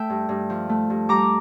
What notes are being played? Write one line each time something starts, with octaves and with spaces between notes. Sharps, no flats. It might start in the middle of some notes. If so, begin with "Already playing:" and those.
Already playing: A3 E5 G5
G2
G2
F3
A3
G2
G3 A#5 D6